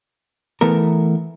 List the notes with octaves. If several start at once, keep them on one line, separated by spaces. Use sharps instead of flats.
E3 A3 B3 A#4